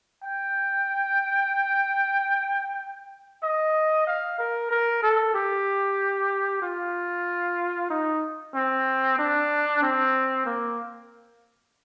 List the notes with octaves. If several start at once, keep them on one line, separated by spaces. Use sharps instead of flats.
G5
D#5
F5
A#4
A#4
A4
G4
F4
D#4
C4
D4
C4
A#3